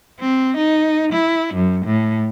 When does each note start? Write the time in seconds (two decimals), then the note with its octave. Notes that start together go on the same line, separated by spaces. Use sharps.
0.20 C4
0.58 D#4
1.13 E4
1.55 F#2
1.86 A2